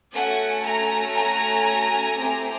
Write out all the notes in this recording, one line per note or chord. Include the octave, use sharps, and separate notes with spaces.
A3 C#4 F#4 F#5 G#5
G#5 A#5
G#5 A#5
A3 C4 E4 G4